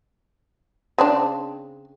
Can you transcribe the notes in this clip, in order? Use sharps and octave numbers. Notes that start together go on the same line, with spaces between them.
C#3 C4 D4